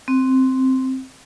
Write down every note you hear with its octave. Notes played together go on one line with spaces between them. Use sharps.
C4